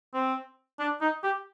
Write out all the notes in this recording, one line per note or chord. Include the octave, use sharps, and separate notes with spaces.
C4
D4
D#4
G4